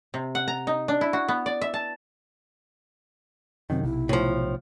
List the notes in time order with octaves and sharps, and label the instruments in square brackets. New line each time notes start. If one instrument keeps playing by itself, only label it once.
[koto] C3
F#5
A#5
D#4
D4
E4
F#4
B3
D5
E5
A5
[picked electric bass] F#2 D#3 [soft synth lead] C3 [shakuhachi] C4
[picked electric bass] B1 [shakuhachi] E4
[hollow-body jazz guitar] A2 F3